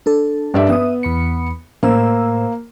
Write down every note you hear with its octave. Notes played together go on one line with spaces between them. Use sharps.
D4 A4
G2 D5 E5
B3 E5 D#6
E2 B5 C#7
A2 A#3 C5 E6